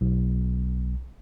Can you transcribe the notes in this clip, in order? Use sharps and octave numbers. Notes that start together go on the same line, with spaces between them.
B1